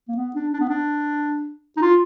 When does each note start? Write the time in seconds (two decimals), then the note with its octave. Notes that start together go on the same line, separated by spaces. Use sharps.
0.08 A#3
0.16 B3
0.35 D4
0.53 D4
0.60 B3
0.69 D4
1.77 D#4
1.82 F4